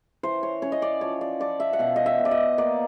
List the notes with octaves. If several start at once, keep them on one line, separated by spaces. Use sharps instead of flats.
E3 C5
C#5
C#4 C#5
D#5
D5
F3 C#5
D5
F3 D5
E5
F#5
B2 F5
D#5
E5
B2
D5
D#5
A#3 D5